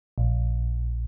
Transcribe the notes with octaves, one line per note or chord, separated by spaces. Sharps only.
A#1